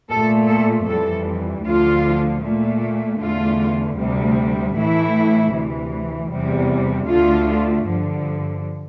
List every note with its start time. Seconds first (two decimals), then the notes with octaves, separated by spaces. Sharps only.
0.10 A#2 A3 A4
0.49 A4
0.88 F2 E3 G3 A4
1.65 D2 D3 F3 F4
2.42 A#2 A3
3.19 E2 D3 A3 F4
3.97 D2 C3 G3
4.74 A2 E3 A3 E4
5.52 D2 C3 E3
6.29 E2 C3 G3
7.06 D2 D3 A3 F4
7.84 G2 D3 F3